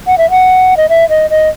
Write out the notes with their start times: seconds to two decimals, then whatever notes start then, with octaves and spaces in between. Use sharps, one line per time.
0.07 F#5
0.18 E5
0.31 F#5
0.77 D#5
0.89 E5
1.09 D#5
1.30 D#5